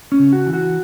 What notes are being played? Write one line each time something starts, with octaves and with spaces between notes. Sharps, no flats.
C#4
C#3
F#4
E3
F#4